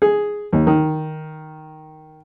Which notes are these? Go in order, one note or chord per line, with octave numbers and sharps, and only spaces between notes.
G#4
D#2
D#3